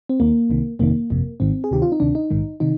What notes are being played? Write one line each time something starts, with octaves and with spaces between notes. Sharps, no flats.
C4
D#2 D#3 A#3
C2 C3 D#3
G1 F2 C3 D#3 A#3
G1 F2 C3
G#1 G#2 D#3 C4
G#4
D2 C3 D#3 G4
F4
D#4
D2 C3 D#3 D4
D#4
A#1 G#2 D#3
C3 D#3 D#4